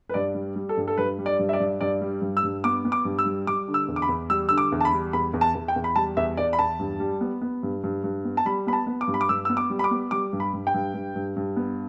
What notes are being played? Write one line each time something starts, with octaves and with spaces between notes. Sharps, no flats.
B4
G2 D5
G3
G3
A4
G2
A4
G2 B4
G3
D5
G2
E5
D5
G2
G2 D5
G3
G2
E6
G2
B3 D6
B3
D6
G2
E6
G3
G3 D6
D3
E6
E2
D6
B5
E2
G3 E6
D3 E6
D6
E2
A5
B5
G3
E2 B5
E2
A5
E2
G5
E2
B5
G3 A5
E2 E5
E2 D5
B5
E2 A5
G2
G3
B3
B3
G2
G2
G2
B3
A5
G3 B5
B3 B5
A5
B3
D6
G2
B5
D6
G2 E6
B3 E6
D6
G3
B5
D6
B3
G3 D6
G2
B5
G2
G5
G2
G2
G2
G2
B3